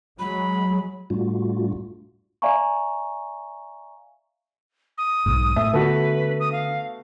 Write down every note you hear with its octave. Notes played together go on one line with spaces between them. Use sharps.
F#3 G#3 B5
A2 G3 A3 D4 F4 F#4
D5 E5 F5 G#5 A#5 C#6
D#6
B1 G#2
A2 E5
D3 A3 B3 F#4 B4
D#6
F5